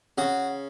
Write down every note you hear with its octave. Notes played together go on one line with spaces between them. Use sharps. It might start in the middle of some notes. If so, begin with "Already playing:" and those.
C#3 F#4